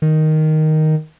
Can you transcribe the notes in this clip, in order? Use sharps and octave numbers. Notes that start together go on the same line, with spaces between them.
D#3